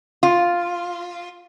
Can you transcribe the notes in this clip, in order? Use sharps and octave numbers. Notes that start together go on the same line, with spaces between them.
F4